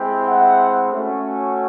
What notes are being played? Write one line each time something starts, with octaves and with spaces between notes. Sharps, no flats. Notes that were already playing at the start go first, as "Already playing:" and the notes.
Already playing: G#3 C4 E4 G4
E5 F#5
A3 C#4 F#4